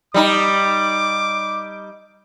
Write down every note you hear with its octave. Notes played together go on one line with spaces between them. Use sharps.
G3 D#4 D6